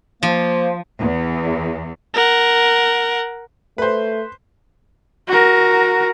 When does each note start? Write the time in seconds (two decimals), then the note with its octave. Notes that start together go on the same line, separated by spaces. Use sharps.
0.23 F3 A#3 C5
1.00 E2
2.14 A#4 F#5
3.78 A3 B4 C5
5.28 F#4 A#4